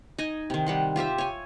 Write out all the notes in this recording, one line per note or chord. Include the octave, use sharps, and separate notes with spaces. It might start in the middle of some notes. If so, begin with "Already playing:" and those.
D#4 D#5 G#5
C3 D#3
G3 F#5 C6
F4 G4 C5 E5
C#5 G#5